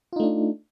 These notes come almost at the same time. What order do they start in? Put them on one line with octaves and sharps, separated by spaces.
F4 D#4 A3 D4